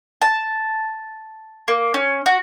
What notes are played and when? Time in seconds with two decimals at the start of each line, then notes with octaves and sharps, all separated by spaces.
0.22 A5
1.68 A#3
1.94 C#4
2.26 F#4